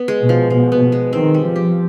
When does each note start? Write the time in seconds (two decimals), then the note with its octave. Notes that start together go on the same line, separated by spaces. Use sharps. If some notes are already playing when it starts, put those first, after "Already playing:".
Already playing: B3
0.08 G#3
0.19 B2
0.29 F3
0.50 B2 F3
0.72 B3
0.92 G#3
1.13 D#3 C4
1.34 G3
1.45 F3
1.56 G4